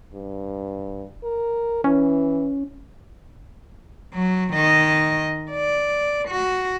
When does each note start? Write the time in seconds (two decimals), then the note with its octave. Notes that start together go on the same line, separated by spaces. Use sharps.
0.14 G2
1.24 A#4
1.84 E3 C#4
4.14 F#3
4.53 D#3 D#5
5.51 D5
6.28 F#4